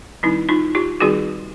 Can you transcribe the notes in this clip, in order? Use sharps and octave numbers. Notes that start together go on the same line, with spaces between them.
D#3 G3 C4 D#4 E4
D#4 F4
F4 G4
D#3 G3 C4 D#4 F#4 G#4